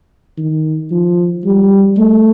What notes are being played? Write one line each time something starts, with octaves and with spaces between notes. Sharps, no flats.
D#3
F3
G3
A3